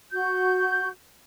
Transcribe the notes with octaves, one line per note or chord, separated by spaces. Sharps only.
F#4 G6